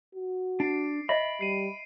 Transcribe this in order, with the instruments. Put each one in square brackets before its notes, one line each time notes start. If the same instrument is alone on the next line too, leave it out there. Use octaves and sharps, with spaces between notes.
[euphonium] F#4
[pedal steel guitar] D4 [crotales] C7 D7
[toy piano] D#5 E5 [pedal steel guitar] B5
[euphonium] G3 [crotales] C7 D#7